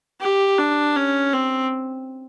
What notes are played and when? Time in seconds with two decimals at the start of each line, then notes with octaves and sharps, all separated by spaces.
0.21 G4
0.59 D4
0.96 C#4
1.33 C4